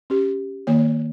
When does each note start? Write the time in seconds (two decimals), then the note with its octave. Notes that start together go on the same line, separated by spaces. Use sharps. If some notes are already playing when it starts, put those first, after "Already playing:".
0.10 C#4 G4
0.67 D#3 A#3 C#5